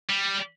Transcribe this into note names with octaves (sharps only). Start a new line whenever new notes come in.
G3